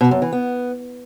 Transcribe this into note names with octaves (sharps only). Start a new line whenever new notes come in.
B2
F#2
E3
B3